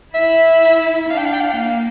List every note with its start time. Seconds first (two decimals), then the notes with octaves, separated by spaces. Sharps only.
0.14 E4 E5
1.10 D4 F5
1.17 G5
1.25 F5
1.33 G5
1.40 F5
1.51 G5
1.57 A#3 F5